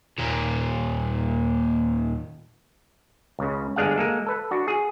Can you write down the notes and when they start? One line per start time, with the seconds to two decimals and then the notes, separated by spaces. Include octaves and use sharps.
0.18 D#2 A#2
3.39 C#2 C#3
3.76 G1 G#3 D4 G#4 F5 F#5
3.98 G#3 A#3 A4
4.27 A4 B4
4.51 D4 F#4
4.68 G#4